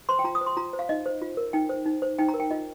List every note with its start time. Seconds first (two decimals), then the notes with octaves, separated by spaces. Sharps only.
0.09 C5 C6
0.19 G5
0.24 F4 A#5
0.35 D#6
0.41 C5
0.46 C6
0.57 F4 A#5
0.73 C5
0.79 F5
0.89 D#4 D#5
1.06 C5
1.22 F4
1.37 A#4
1.53 D#4 G5
1.69 C5
1.86 D#4
2.02 C5
2.19 D#4 G5
2.29 A#5
2.34 A#4
2.40 G5
2.51 F4 D#5